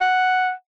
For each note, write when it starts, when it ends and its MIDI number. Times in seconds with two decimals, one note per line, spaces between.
0.01 0.52 78